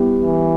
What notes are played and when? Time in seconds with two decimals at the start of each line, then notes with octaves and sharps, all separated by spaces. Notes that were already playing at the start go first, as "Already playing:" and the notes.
Already playing: G3 B3 E4 G4
0.22 E3